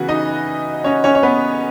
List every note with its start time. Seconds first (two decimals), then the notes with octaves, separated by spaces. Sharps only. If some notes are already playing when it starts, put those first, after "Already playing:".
Already playing: C#3 E3 B3 F#4
0.08 D#4 D#5
0.84 C#4 C#5
1.04 C#4 C#5
1.15 C#5
1.23 B3 B4